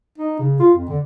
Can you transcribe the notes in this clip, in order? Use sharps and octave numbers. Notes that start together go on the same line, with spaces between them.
D#4
C#3
F4
F2
D3